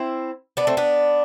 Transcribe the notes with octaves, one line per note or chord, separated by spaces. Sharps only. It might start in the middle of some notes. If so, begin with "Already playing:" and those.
Already playing: C4 E4
B3 D4
A3 C4
B3 D4